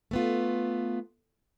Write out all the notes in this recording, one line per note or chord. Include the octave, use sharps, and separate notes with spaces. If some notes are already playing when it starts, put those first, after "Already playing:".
A3 B3 F4